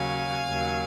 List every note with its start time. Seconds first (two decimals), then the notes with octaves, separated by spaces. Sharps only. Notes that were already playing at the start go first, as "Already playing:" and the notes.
Already playing: D#2 C#3 F#3 F5 G#5
0.46 D#2 C#3 F#3